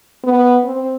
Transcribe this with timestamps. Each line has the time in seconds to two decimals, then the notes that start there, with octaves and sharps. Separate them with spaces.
0.24 B3
0.64 C4